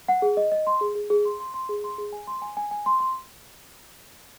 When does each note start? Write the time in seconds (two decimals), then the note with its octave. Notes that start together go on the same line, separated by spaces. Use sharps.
0.08 F#5
0.22 G#4
0.37 D#5
0.52 D#5
0.67 C6
0.81 G#4
0.95 G#4
1.10 G#4
1.25 C6
1.40 C6
1.54 C6
1.69 G#4
1.84 C6
1.98 G#4
2.13 G#5
2.27 C6
2.42 G#5
2.57 G#5
2.71 G#5
2.86 C6
3.00 C6